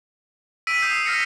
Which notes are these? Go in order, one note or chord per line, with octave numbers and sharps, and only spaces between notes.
E6 B6 D7 D#7
D#6 G6 C7
E6
F6 A#6 C#7